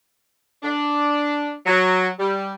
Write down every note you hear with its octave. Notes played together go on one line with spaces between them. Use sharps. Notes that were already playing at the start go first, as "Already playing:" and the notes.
D4
F#3
G3